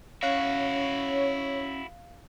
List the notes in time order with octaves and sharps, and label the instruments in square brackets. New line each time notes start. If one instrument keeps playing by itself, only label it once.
[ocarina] C#4 [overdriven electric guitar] E4 F#4 [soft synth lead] C#5 [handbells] F5 F#6